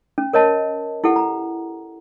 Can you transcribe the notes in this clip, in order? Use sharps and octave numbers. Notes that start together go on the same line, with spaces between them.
C#4
A#4 C#5 D#5 A5
E4 G4 A4 F#5
A#5